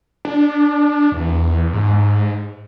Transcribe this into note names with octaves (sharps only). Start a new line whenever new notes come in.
D4
E2
G#2